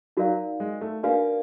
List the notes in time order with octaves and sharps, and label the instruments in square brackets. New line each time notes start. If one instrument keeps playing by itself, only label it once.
[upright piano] F#3 [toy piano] D#4 F#4 A#4 D5 F5
[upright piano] G#3
A3
[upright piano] A#3 [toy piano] D4 F#4 B4 D5 F5